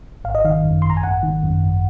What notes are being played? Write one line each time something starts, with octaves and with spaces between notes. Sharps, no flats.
G#1 F5
D#5
D#3 F5
F#2
G#1 C6
A#5
G#5
G#1 F#5
D#3
F#2
G#1